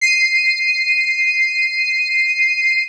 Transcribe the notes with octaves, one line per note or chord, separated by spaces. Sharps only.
C7 D#7